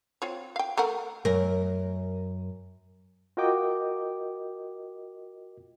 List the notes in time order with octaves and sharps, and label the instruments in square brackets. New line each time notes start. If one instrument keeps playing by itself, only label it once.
[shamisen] C4 F4 C#5
F5 G5
A3 A#4 F#5
[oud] F#2 A#4
[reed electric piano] F4 F#4 A#4 D#5 G5 D6